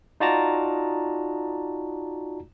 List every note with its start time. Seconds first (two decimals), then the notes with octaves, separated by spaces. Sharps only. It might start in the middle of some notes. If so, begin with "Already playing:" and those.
0.20 D#4 F4 F#4 D5 A5 A#5